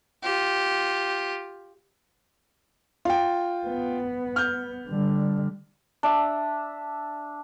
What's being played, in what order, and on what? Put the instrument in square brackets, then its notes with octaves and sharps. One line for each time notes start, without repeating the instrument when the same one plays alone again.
[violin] F4 G4
[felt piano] F4 G5
[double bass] B3
[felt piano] F6 G6
[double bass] D3 G3
[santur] D4 E5